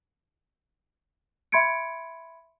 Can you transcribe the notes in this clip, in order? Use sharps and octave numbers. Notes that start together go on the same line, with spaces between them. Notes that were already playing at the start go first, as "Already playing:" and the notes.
E5 B5 C6 G#6 C#7 D7